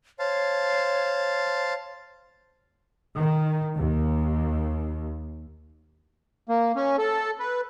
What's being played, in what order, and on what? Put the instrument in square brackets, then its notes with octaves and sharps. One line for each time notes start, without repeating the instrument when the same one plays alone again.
[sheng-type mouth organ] C5 F5 A5 [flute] C#5
[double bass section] D#3
D#2
[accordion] A#3
C#4
A4
B4